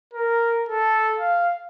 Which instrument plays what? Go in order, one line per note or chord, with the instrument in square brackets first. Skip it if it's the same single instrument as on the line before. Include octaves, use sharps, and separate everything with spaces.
[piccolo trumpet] A#4
A4
F5